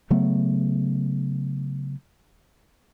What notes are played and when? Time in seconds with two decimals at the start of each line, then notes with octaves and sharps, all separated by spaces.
0.10 C#3 F#3 A3 B3